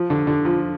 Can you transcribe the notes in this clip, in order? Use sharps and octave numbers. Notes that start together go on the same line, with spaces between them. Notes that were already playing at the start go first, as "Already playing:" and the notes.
Already playing: F3
D3
D3
F3